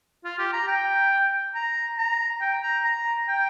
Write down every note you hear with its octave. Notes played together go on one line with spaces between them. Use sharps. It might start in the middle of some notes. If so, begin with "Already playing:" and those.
F4
G4
A#5
G5
A#5
A#5
G5
A#5
A#5
G5